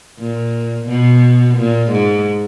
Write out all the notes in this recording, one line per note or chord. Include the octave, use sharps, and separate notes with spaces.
A#2
B2
A#2
G#2